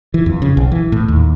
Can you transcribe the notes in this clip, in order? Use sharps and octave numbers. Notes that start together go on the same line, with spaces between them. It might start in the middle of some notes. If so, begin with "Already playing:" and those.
E3
F2
C#3
B1
E3
A2
D#2